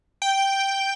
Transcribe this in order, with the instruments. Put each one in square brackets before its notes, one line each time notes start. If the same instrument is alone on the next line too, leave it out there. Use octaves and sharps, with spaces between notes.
[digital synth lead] G5